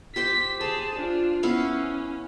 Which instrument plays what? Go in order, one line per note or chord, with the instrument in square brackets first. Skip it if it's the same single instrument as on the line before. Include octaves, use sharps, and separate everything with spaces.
[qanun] G4 C5 G5 [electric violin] B6
[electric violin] G#4 A5 [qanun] C5
[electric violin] D4 F4
[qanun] B3 E4 F5 [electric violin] C#4